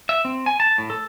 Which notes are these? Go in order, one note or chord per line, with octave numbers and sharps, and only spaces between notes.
E5
C4
G#5
A5
A2
A4